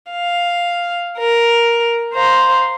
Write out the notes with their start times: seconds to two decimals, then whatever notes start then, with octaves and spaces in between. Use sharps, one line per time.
0.12 F5
1.17 A#4
2.15 C5 F5 A#5